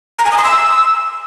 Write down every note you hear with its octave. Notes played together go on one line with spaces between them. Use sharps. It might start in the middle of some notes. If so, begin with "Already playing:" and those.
A#5
G#5
D#6
C6
E6